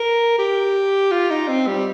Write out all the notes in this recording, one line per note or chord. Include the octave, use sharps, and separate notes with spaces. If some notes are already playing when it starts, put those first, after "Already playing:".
Already playing: A#4
G4
F4
D#4
C4
G3